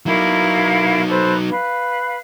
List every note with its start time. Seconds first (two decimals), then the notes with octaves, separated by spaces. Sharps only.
0.06 F#3 D#4 E4 A#4 F5
1.08 A4 B4 C5
1.48 B4 F5